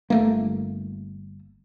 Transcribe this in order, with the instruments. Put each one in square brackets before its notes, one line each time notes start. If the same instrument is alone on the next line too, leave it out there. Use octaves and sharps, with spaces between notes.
[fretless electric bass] G1 A3 A#3